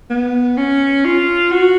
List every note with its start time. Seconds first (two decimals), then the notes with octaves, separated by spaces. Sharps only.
0.10 B3
0.57 C#4
1.05 F4
1.52 F#4